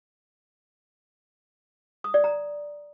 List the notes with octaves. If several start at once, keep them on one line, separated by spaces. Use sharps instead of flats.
D#6
D5
A#5